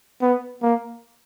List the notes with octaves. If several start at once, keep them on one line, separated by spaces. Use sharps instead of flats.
B3
A#3